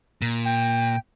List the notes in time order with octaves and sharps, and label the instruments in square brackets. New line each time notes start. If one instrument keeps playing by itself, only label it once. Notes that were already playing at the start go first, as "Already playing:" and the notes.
[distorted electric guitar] A#2
[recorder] G5